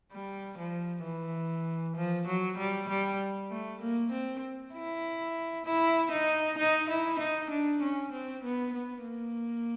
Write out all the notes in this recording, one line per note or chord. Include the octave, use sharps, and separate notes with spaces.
G3
F3
E3
F3
F#3
G3
G3
A3
A#3
C4
E4
E4
D#4
D#4
E4
D#4
D4
C#4
C4
B3
B3
A#3